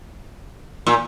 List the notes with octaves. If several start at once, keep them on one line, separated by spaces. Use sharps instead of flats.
A#2